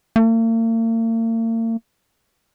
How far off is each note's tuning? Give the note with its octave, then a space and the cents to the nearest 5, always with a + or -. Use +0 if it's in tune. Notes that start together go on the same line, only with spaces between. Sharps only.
A#3 -45